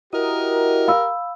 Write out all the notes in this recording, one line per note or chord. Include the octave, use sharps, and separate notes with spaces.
E4 F#4 G4 A#4 D#5
F5 B5 E6